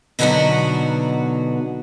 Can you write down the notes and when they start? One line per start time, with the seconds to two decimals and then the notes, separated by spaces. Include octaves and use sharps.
0.19 B2 D3 F#3 B3 D#4 F#4